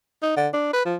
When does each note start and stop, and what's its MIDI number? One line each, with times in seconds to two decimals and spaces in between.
0.23 0.36 63
0.37 0.48 50
0.53 0.69 62
0.73 0.85 71
0.85 0.96 53